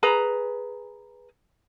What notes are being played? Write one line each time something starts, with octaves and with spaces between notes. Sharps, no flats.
G#4 B4 A#5